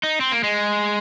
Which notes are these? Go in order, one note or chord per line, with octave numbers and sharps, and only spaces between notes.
D#4
C4
A#3
G#3